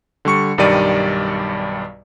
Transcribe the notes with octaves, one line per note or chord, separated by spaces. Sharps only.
D3 G3 C#6 C#7
B1 G2 D#3 G3 D5 D#7